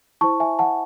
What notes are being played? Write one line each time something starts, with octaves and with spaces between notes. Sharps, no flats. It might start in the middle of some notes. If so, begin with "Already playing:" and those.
E4 C5 A5 C#6
E5 G#5
F#5 A5